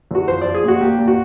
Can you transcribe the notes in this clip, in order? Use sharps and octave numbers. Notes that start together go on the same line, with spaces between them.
E2 F#4
F3 C5
F3 D5
G#4
A#2 F#4
A#3 G4
A#2
F#4